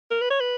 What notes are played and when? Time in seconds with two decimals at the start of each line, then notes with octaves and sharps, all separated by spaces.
0.11 A#4
0.21 B4
0.30 C#5
0.40 B4